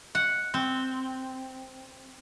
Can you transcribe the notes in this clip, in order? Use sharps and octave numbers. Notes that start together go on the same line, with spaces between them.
F#5
C4